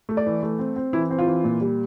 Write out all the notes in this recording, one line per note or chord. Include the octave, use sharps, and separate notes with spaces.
A3
D5
E3
A3
C4
C4
E3 E4
C4
F4
E3
A#2
G3